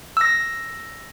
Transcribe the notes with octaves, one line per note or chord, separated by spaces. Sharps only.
E6 A#6